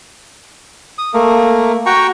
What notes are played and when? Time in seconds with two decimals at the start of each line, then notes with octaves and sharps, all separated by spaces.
0.98 D#6
1.14 A3 A#3
1.86 F#4 G5 A#5 C#6